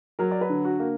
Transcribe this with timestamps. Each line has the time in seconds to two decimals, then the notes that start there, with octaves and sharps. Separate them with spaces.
0.19 F#3 A#4
0.31 D5
0.41 B4
0.50 D3
0.65 F#4
0.80 A#3